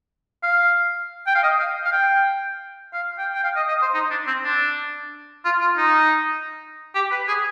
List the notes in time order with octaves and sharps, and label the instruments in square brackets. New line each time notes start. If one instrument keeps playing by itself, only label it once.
[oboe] F5
G5
F5
D#5
F5
F5
G5
F5
G5
G5
F5
D#5
D#5
C5
D#4
D4
C4
D4
F4
F4
D#4
G4
B4
G#4